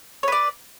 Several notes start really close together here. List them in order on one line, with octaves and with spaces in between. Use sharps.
C#5 B4 D5